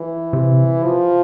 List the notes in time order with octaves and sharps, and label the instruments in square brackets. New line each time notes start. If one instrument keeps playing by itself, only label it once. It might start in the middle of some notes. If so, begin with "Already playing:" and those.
Already playing: [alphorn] E3
[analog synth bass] C3
[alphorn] F3